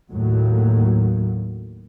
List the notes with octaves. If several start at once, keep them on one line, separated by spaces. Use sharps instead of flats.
D#2 A2 F#3